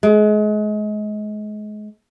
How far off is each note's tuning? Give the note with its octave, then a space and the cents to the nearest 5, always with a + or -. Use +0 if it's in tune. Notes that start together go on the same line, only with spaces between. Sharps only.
G#3 +30